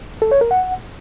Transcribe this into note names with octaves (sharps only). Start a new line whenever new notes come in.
A4
C#5
A#4
F#5